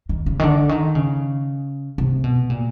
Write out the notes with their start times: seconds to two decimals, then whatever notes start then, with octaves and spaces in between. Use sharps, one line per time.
0.09 D#3
0.26 C#3
0.39 D#3
0.43 D3
0.69 D#3
0.95 C#3
1.98 C3
2.24 B2
2.50 A#2